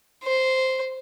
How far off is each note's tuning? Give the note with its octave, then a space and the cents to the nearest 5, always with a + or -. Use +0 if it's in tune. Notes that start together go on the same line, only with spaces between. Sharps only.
C5 -5